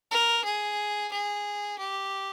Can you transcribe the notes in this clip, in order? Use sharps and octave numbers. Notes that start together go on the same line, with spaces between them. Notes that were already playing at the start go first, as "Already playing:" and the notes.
A#4
G#4
G#4
G4